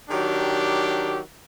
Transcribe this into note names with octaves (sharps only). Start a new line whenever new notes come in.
D#3 F#3 D4 G4